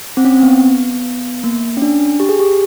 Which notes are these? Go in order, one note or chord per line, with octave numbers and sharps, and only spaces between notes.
C4
C#4
C4
B3
A#3
C#4
D4
G4
G#4
G4